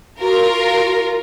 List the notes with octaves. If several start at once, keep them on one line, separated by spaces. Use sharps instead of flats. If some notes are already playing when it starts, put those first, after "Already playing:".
F4 F#4 A#4